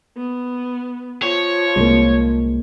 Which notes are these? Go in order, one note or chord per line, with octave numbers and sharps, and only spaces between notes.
B3
F3 C#5
C2 G#3 A#3